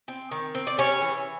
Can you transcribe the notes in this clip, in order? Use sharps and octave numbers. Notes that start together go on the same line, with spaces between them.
C4
D#3
C4
D5
G3 C#4 C#5
E3